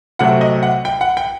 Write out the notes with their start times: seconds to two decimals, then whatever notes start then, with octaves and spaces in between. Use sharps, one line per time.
0.19 C3 F#3 A3 C4 F#5
0.41 D#5
0.63 F#5
0.85 G5
1.01 F#5
1.17 G5